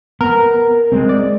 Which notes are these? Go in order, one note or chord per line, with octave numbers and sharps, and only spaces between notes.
B3 A#4
G#3 A3 C4
D5